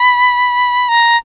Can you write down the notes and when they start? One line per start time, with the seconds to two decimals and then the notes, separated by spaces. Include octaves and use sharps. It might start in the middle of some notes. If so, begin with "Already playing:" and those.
Already playing: B5
0.89 A#5